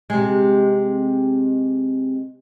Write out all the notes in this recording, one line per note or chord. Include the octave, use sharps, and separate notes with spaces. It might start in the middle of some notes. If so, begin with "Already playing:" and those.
C3 G#3